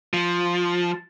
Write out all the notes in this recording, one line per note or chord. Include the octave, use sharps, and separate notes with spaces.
F3